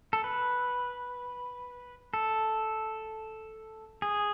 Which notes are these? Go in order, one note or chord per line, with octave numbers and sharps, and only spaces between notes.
A4
B4
A4
G#4